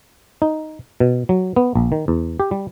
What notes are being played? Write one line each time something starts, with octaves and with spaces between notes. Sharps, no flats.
D#4
B2
F#3
B3
A#1
D#3
E2
G4
G3